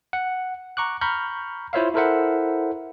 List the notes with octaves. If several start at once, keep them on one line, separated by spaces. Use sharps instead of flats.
F#5
A#5 C#6 D6 F#6
A#5 B5 C#6 F6 G6
E4 F4 C5 C#5 E5 F5
E4 A4 A#4 C5 E5 F#5